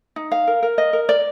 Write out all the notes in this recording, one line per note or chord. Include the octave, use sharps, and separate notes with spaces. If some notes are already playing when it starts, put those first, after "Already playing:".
D#4
F5
A#4
A#4
D#5
A#4
D5